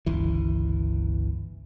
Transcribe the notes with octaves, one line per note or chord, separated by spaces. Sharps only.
G1 C#2 E3